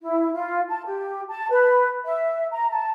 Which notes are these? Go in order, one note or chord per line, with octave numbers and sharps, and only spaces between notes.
E4
F4
A5
G4
A5
B4
E5
A#5
A5